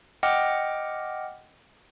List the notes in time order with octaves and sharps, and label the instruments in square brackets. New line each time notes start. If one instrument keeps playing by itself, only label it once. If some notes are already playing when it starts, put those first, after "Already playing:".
[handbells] D#5 F#5 G5 D6 F6